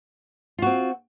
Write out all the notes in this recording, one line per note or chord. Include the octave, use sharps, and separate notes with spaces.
C4 F4 F#4